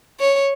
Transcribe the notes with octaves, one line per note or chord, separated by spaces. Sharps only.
C#5